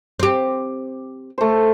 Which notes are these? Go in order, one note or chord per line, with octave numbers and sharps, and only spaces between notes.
C4 G4
A3 C5